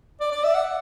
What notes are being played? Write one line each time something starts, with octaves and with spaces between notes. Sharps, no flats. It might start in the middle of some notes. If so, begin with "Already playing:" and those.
D5
D5
E5
F#5